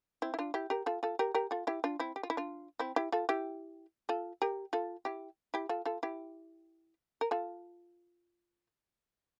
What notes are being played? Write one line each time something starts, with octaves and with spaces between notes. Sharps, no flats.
C4 E4
E4
D4 F4
E4 G4
G4 A#4
F4 A4
F4 A4
G4 A#4
G4 A#4
F4 A4
E4 G4
D4 F4
C4 E4
G4
F4
E4
D4 F4
C4 E4
E4 G4
F4 A4
E4 G4
F4 A4
G4 A#4
F4 A4
E4 G4
E4 G4
F4 A4
F4 A4
E4 G4
A#4
F4 A4